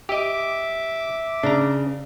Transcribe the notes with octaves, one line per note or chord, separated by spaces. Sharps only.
G4 D#5 E5 D6
C#3 D4 A#5